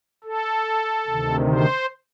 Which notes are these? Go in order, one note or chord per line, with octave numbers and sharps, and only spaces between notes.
A4
D2 C3 D#3
C5